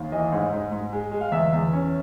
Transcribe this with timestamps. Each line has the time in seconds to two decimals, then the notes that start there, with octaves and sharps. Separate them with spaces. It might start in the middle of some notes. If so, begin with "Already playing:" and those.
Already playing: D#2
0.12 E3 D#5
0.32 G#2
0.53 G#2
0.72 G#2
0.93 G#3
1.12 G#3
1.21 F5
1.32 E2 E5
1.53 E2
1.73 C#4